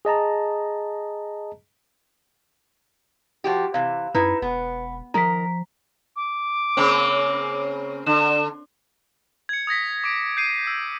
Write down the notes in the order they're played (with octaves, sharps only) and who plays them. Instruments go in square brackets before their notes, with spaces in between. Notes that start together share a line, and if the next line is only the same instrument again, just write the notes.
[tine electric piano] G#4 D#5 A5 A#5
[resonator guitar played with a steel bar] F3 F#4 G4
[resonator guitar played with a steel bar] C3 E3 [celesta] F5
[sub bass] F#2 [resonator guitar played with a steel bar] D#4 E4 [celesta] B4
[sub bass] E1 [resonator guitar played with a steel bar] B3
[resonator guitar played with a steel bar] D#3 A#4 [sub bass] F3 [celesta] A#5 B6
[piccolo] D6
[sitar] C#3 A#3 C4
[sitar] D3 [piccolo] E7
[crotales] G#6 C#7
D#6 G#6 A#6 B6
D6 D7
G6 C7 D#7
E6